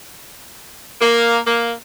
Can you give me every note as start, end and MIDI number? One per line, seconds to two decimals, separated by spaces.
1.01 1.39 58
1.46 1.72 58